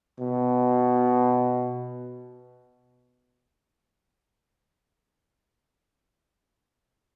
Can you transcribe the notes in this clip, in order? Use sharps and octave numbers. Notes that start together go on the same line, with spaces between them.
B2